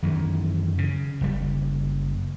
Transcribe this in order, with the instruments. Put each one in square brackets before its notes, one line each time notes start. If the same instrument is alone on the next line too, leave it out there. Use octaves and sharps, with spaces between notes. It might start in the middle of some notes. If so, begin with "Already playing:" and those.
[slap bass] F#2 D#3 E3
C#3
F#1 G3